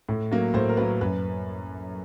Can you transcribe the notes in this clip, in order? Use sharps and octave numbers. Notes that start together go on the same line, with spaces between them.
A2
F#3 A#3
A2 C5
A#4
F#3 A#3 B4
F#2 B4